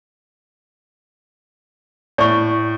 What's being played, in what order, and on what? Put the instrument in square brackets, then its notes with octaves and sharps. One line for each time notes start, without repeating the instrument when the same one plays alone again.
[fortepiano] A2 [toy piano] D5 C#6